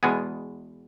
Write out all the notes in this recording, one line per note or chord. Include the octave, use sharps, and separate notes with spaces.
E2 B2 G#3 B3 G#5